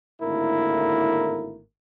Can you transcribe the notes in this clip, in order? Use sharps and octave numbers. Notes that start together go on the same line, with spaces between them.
G#1 A2 D3 A#3 E4 A#4